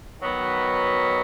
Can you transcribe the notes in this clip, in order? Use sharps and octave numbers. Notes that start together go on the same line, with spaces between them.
D#3 F#3 B3